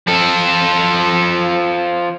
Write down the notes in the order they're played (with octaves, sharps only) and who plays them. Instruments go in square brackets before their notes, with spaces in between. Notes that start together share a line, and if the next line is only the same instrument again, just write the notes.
[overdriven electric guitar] F3 A4